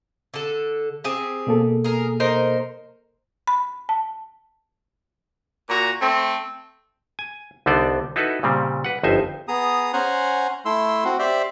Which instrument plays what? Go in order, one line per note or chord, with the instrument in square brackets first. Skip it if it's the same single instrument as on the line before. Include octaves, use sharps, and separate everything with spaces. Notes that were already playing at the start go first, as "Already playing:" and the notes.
[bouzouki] D3 A4
C4 G4 G#4
[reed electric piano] B2 A#3 A4
[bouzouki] G#4 A#4
D#4 A#4 C5
[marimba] B5
A5
[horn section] A#2 F#4 A#5
A3 C4
[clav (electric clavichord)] G#5
C2 D3 B3 D#4 C5 D5
D#4 E4 F#4 A4 B4
A#2 C#3 G3 C4
B4 F#5
G1 F2 D#4 C5 E5 G#5
[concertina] B3 G#4 A#5 D#6
C#4 C5 F#5 G#5 A#5
A3 E4 C6 E6
C4 F#4
G4 C5 D5 E5